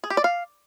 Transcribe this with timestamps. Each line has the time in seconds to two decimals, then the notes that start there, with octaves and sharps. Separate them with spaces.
0.04 G#4
0.10 G4
0.17 D5
0.24 F5